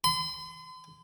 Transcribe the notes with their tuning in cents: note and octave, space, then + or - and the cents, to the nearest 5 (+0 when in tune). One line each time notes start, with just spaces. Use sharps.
C6 -40